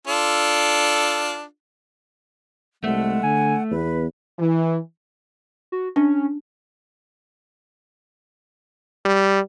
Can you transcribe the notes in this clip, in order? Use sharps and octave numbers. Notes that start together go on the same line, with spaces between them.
D4 F4 A4
C2 G#3 A3 F#5
D3 G#5
E2 B3 B4
E3
F#4
C#4 D4
G3